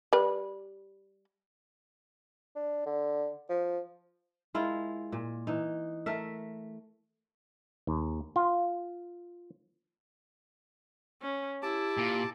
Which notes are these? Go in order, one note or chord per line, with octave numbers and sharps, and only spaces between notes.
G3 B4
D4
D3
F3
G#3 E4 F4 A#4
A#2
E3 D#4
A3 A#4 E5
D#2
F4
C#4
E4 G4 A5 D6
A#2